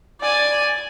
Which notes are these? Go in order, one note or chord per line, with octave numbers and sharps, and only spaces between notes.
D5 G#5